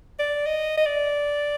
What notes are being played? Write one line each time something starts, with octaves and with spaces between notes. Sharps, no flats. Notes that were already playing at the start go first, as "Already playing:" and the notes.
D5
D#5
D#5
D5